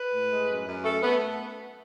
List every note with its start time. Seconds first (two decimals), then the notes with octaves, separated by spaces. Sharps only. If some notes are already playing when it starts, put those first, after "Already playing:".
Already playing: B4
0.12 A2
0.30 G#3
0.48 F#2
0.66 F#2
0.84 A3 A4
1.03 A3 B3